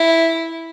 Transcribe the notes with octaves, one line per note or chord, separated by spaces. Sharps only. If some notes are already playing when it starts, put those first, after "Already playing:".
Already playing: E4